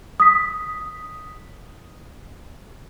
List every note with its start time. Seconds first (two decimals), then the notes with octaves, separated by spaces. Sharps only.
0.20 D#6 B6